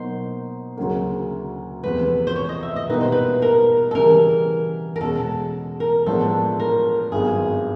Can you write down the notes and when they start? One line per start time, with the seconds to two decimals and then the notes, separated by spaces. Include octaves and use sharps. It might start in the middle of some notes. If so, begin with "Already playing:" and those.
Already playing: B2 F#3 A#3 D#4 C5
0.77 D2 C#3 F#3 A#3
1.83 E2 C3 F3 A3 B4
2.27 C5
2.36 C#5
2.49 D#5
2.63 E5
2.76 D#5
2.89 B2 G3 A#3 D#4 B4
3.01 C5
3.12 B4
3.42 A#4
3.91 A4
3.95 C#3 E3 G3 A#4
4.96 A#4
5.00 E2 B2 G#3 C#4 A4
5.80 A#4
6.06 A2 F3 G#3 B3 D4 A4
6.59 A#4
7.12 G#1 G2 D#3 F#3 B3 G#4